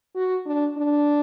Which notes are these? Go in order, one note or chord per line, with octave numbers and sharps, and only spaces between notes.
F#4
D4
D4